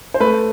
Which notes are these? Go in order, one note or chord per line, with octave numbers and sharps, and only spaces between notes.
C5
A3 B4